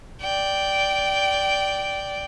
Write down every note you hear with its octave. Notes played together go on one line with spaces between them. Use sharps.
D5 G5